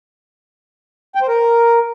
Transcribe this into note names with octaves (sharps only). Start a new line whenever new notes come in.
G5
C5
A#4